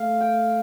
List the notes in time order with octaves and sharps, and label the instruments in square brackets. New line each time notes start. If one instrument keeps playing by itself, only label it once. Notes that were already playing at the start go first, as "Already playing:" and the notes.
Already playing: [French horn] A3 [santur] F5
[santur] G5